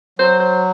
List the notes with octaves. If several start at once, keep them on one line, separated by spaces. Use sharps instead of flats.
F#3 C5
C5